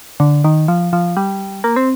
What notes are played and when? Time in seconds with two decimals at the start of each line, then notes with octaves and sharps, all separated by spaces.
0.20 D3
0.44 D#3
0.68 F3
0.93 F3
1.17 G3
1.64 A#3
1.76 C4